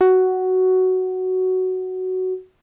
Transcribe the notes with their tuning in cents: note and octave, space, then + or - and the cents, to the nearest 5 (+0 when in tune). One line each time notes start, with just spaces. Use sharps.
F#4 +10